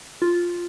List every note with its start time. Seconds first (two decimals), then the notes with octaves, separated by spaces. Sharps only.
0.22 F4